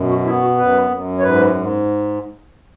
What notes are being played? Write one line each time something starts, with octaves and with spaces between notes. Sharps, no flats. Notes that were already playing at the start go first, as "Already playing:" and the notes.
Already playing: F#2 B2
F#4
B3 E4
F#4
F#2 B4
F#2
C#5
G#2 B4
G#2